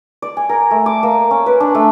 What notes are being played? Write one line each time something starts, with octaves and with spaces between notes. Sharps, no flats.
D5
G#5
A#4
A3
D6
A#3
C#4
B4
D4
A3